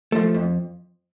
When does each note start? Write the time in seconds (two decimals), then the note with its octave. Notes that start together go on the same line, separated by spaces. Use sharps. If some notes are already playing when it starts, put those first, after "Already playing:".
0.12 F3 A3
0.35 F2